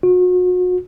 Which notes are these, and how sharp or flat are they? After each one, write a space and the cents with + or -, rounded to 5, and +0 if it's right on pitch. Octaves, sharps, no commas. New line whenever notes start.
F#4 -35